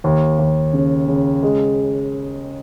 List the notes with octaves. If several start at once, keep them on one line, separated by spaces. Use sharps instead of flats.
D#2
D#2
C#3
C#3
G#3